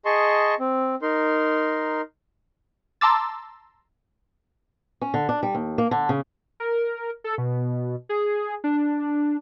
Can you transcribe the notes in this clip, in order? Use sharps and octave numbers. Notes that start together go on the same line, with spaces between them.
G#4 D#5 A5 C6 C#6
C4
D#4 A#4 C6
A5 A#5 C6 D6 E6 A6
C#4
D3
D4
G3
D#2
A#3
D3
C#3
A#4
A4
B2
G#4
D4